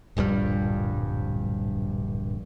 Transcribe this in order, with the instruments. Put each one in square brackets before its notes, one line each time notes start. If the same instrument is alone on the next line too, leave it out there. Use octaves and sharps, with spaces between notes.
[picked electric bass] D1 A#1 G2 G3